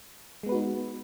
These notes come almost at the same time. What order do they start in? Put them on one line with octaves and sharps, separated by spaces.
G#3 B3 B4 F#4 D#4